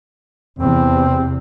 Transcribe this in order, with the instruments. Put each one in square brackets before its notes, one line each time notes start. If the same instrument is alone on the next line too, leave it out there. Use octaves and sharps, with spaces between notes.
[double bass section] E2 C3 [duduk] C4